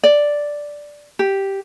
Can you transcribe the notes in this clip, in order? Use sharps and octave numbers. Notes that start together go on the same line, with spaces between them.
D5
G4